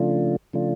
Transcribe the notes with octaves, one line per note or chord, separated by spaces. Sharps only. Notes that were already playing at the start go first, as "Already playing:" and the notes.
Already playing: C#3 F3 A3 D4 F4
C#3 F3 A3 D4 F4